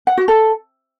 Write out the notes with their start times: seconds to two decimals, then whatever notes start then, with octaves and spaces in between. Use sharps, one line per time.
0.07 F#5
0.17 F#4
0.28 A4